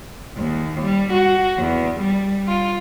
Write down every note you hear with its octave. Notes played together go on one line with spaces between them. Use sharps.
D#2
G3
F#4
E2
G3
F4